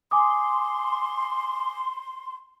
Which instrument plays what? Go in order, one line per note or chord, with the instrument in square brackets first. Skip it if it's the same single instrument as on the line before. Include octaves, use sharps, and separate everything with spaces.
[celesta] G#5 D6 D#6 [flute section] C6